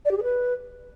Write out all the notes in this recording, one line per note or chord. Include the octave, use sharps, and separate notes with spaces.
D5
G4
G#4
B4